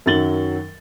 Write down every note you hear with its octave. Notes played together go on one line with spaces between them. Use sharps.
F#2 D#3 F#3 A6 F#7 G7